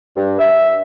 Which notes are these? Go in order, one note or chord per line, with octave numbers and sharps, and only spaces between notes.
G2
E5